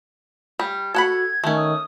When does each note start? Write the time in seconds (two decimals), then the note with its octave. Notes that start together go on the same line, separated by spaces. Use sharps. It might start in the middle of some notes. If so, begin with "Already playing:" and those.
0.59 G3
0.94 F#4 A4 F#5 B5 G#6
1.44 D#3 A3 C#4
1.57 D#6